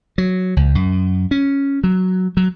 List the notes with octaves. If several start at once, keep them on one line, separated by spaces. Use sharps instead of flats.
F#3
C#2
F#2
C#4
F#3
F#3